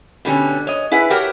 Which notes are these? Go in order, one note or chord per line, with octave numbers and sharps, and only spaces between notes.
B2 D3 G3 C#4
C#5 D#5
E4 G#4 B4 F#5
F#4 G4 A#4 C#5 F#5 G5